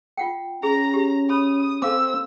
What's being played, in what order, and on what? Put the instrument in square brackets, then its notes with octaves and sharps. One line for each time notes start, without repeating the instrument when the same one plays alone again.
[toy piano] F4 F#5 G5
[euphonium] C#4 [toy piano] G#4 [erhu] A#5
[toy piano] G4
[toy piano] C#5 B5 [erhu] D#6
[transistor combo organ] C4 [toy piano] A4 F5 D6 [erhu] E6